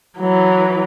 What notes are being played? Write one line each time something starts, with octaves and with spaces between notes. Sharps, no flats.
E3 F#3